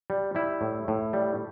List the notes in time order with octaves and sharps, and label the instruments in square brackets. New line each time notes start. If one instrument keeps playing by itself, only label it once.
[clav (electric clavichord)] G3
G3 E4
A2
A2
G3